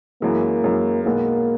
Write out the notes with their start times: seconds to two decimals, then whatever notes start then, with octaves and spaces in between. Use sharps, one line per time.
0.22 F#2 E3 G#3 A#3
0.64 F#2 E3 G#3
1.05 B1 B2 G#3 A#3 B3